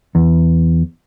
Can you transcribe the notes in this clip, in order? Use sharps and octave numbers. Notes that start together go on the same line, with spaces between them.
E2